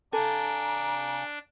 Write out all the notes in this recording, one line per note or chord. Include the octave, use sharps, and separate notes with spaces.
D4 A4 F5 G#5 A#5